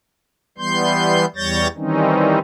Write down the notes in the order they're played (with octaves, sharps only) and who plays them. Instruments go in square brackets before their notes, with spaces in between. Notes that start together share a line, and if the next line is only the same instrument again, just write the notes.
[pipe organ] E3 G3 B3 C6 G6
E2 G3 C#5 G6 A6 A#6
D#3 E3 G3 C4 C#4 D#4